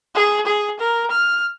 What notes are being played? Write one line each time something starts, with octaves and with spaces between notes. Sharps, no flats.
G#4
G#4
A#4
F6